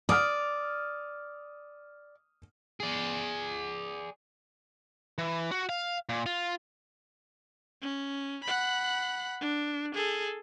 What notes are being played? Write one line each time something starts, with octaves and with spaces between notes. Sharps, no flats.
D5 D#6 F6
G#4 D5
E3
F#4
F5
A#2
F4
C#4
F#5 B5
D4
G#4 A4